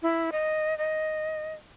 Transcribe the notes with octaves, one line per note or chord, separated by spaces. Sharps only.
E4
D#5
D#5